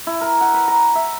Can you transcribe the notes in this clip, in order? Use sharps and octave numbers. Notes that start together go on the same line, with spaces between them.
E4
A#4
F#5
B4
A#5
E5